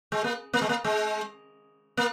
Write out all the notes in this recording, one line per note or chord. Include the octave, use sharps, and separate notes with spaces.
G#3
A#3
A#3
G#3
A#3
G#3
A#3